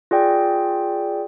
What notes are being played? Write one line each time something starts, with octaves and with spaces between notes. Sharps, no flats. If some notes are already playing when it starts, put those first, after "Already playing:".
F4 G#4 D5 G5